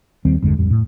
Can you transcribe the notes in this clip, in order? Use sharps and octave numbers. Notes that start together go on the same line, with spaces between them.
D#2 D#3 G3 C4
G1 E2 D3 G#3
A1 F2 G3
A2